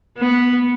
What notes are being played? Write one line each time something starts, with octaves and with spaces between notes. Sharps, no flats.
B3